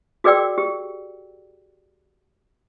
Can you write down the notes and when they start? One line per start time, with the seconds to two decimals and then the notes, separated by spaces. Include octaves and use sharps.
0.24 F#4 G#4 A#4 D5 G5 E6
0.58 G4